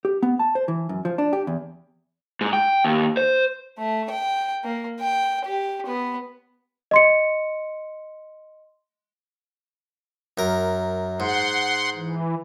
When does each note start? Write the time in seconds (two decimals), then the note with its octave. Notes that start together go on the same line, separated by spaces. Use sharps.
0.05 G4
0.23 B3
0.39 A5
0.55 C5
0.68 E3
0.89 F#2
1.05 F3
1.18 D4
1.33 G4
1.47 E2
2.41 G#2
2.53 G5
2.85 D#2
3.17 C5
3.78 A3
4.10 G5
4.64 A#3
5.00 G5
5.45 G4
5.86 B3
6.91 D#5 C6 C#7
10.38 F#2 A#4
11.20 G#2 F#5 C6
11.96 E3